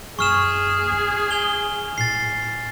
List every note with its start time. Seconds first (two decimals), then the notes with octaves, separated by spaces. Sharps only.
0.19 F#2 A#3 G#4 C#6 F6 E7
0.92 C4 C#4
1.31 G#5 F7 G7
1.98 A2 A6 C7